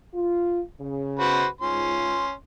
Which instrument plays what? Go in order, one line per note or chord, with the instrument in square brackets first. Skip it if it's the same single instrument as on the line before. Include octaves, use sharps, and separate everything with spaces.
[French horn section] F4
C#3
[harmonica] F#4 B4 C5
[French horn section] G#2 F4 [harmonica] C#4 C6